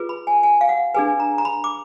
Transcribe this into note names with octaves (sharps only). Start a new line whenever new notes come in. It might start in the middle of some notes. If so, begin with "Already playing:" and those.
Already playing: F4 G#4 B4
B5
G#5
G#5
F5
F#5
D4 G#4 B4 G#5
A#5
A#5
B5
D6